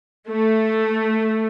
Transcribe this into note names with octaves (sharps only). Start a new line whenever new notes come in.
A3